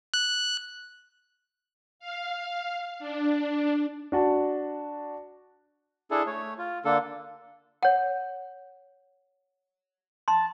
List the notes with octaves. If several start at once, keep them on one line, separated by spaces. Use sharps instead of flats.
F#6
F5
D4
D4 F#4 A5
D4 E4 G#4 A4
A3 C#5
F4
D3 A#3 D4 A4
C#5 F#5
A5 C6